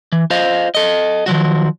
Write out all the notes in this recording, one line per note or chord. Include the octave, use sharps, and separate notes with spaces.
E3
F4 C5 D#5 F5
A4 D#5
D#3 F3 F#3 F#4